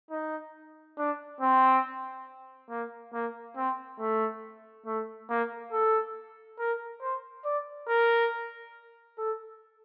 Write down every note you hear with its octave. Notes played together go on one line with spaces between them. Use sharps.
D#4
D4
C4
A#3
A#3
C4
A3
A3
A#3
A4
A#4
C5
D5
A#4
A4